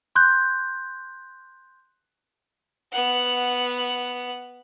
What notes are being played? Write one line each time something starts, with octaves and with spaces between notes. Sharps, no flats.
C6 F#6 G6
B3 F#5